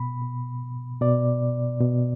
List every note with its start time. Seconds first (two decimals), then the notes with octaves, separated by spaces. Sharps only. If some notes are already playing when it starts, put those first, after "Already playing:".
Already playing: B2 B5
0.22 B2
1.01 B2 D5
1.81 B2